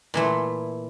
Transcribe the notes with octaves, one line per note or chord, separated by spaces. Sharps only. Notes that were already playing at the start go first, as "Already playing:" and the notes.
A#2 E3 A3